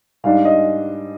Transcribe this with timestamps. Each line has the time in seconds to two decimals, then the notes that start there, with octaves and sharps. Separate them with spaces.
0.24 G#2 G3 D4 F5
0.45 D#5